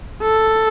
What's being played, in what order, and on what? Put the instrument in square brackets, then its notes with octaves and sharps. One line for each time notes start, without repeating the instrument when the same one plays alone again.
[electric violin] A4